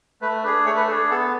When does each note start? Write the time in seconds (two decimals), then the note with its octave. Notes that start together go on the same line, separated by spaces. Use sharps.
0.21 A3 B4
0.43 D4 G#4 B4
0.66 A3 C#5
0.77 B4
0.88 D4 G#4 A4
1.10 B3 A4